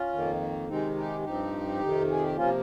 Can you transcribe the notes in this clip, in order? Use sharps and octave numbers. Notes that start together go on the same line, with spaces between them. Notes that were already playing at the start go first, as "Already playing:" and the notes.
Already playing: C#4 F4
F2 D#3 A#3
C3 D#3 G#3 C4 D#4
D#4 G4
G2 F3 C4 D#4 G4
F2 C3 D#3
G#4
G4
C3 F3 A#3 C#4 F4